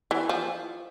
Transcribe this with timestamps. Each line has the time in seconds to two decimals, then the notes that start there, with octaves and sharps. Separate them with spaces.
0.11 E3
0.29 F3